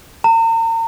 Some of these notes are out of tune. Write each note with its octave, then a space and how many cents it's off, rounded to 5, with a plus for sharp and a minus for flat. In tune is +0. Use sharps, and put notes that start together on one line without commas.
A#5 -40